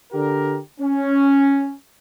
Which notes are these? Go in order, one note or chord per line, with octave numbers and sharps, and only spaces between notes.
D3 G4 A#4
C#4